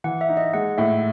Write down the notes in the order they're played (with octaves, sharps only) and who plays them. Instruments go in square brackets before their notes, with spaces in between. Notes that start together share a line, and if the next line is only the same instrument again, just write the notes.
[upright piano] E3 [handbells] F#5
[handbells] E5
[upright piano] D#4
[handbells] D#5
[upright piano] G#3 [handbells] F#5
[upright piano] A2 [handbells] E5